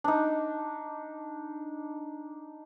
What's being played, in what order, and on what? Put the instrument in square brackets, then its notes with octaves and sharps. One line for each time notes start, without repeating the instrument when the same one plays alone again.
[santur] D4 D#4